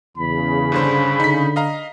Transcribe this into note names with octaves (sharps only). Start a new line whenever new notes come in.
E2 C#3 B5
G2 D3 C5
D3 D#4 B6
D#5 F5 A#5